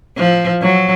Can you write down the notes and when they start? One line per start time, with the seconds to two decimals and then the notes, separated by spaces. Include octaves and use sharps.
0.18 F3
0.62 F#3